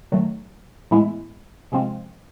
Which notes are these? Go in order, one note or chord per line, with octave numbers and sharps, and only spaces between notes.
D#3 F#3 A3
A2 E3 G#3 B3 E4
C3 F3 G#3 C4 F4